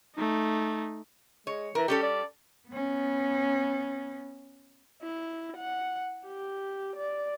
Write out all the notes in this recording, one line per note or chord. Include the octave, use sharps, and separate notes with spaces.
A3 D#4
G#3 C#5
E3 A#4
G3 C#4 G4 A4
D5
B3 C#4
E4
F#5
G4
D5